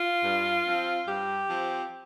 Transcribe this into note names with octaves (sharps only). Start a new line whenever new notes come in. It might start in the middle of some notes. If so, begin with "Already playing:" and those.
Already playing: F4
G2
F3 C4
G2 G4
F3 C4